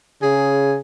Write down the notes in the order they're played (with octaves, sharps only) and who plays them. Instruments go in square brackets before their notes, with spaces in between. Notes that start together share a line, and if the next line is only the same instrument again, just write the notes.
[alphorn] C#3 [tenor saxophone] G#4